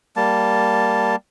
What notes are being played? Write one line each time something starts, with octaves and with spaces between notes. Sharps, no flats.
G3 A#3 A5